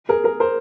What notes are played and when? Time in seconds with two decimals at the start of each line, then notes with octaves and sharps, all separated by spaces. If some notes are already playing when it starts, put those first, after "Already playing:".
0.09 G#4 A#4
0.24 G#4 A#4
0.40 A#4 C5